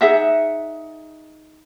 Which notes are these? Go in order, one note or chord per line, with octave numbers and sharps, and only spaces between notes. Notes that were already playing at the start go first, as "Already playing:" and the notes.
D#4 G#4 E5 F#5